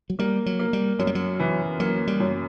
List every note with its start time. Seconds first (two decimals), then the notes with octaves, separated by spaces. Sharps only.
0.10 F#3
0.19 G3 A#3
0.46 F#3
0.59 A#3
0.73 G3
0.99 F#2 F#3
1.07 G3
1.15 F#3
1.40 E3
1.80 F#3 A#3
2.07 G3
2.20 F#2